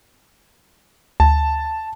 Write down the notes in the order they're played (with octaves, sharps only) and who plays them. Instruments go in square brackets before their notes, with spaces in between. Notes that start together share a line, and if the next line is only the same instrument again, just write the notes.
[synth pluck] D2 [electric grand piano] A5